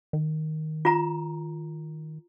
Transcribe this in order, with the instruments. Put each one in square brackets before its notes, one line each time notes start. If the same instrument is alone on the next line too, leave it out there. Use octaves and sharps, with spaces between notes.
[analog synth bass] D#3
[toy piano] F4 A#5